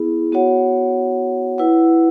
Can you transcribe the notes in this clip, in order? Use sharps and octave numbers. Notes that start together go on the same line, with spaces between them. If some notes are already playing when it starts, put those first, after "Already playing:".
Already playing: B3 E4 G#4
B3 F#4 C#5 F#5
E4 B4 F#5